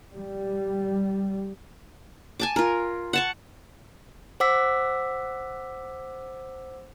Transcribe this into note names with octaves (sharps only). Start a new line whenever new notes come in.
G3
G#5 A5 D6
F4 A#4
F#5 A5 C#6
C5 F#5 D6 E6 B6